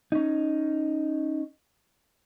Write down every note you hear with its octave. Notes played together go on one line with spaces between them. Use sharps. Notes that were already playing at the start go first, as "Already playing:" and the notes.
C#4 D#4